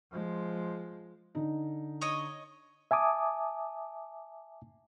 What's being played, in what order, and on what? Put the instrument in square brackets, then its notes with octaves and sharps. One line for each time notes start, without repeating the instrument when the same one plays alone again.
[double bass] F3 G#3
[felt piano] D3 D#4
[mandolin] C#5 D#5 D#6
[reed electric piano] E5 G#5 A5 D6 D#6